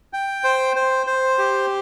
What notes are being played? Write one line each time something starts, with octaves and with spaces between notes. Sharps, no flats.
G5
C5
C5
C5
G4